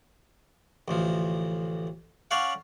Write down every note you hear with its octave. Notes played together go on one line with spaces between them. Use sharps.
A1 D2 F3
C#4 C#5 D5 F5 F#5